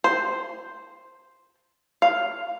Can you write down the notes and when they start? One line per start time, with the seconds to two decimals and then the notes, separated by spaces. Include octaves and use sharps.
0.04 C5
2.02 F5